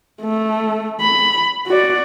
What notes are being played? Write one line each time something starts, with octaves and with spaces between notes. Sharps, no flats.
A3
B5
F#4 D5